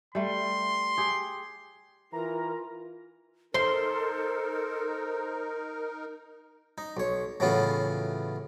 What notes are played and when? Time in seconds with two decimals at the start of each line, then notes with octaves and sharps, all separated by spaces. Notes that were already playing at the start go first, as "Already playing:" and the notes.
0.15 G3 A3 C6
0.97 G4 G#4
2.13 E3 F4 A#4 A#5
3.54 D#4 A4 A#4 C5 C6
6.78 D#4
6.97 B1 C#5
7.40 A2 C#3 E3 F#3 B3 F4